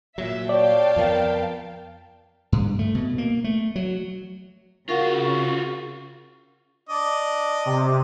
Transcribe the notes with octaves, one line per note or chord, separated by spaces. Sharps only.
A#2 F#3 E5
C#5 D5 F5 G5 A5
F2 F3 B3 A#4
G2
A3
B2
A#3
A3
F#3
C#3 F4 F#4 A#4 F5 F#5 C#6
D4 D5 D#5
C3